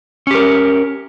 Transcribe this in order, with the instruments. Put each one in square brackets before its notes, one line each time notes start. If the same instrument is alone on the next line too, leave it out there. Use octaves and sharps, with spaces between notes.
[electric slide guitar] C#4
G4
A#4